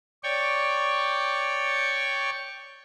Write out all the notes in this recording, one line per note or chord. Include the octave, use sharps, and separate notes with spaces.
C#5 D5 G5 C#6